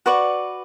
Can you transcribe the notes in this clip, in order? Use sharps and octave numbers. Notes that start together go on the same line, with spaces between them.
F#4 B4 D5 C#6